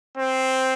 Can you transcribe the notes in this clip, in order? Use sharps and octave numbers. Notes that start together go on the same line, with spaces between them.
C4 C5